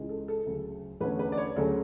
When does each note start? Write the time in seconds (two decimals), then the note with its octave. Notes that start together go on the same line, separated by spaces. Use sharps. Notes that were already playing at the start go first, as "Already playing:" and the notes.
Already playing: C#2 C#3 E3 G#3
0.09 A4
0.28 A4
0.46 D2 C#3 F#3
1.01 E2 D3 A3 C#4 B4
1.19 B4
1.32 D5
1.38 C#5
1.56 D2 C#3 F#3 A3 C#4 A4